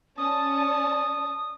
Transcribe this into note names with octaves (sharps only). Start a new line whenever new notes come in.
C#4 D5 A5 D#6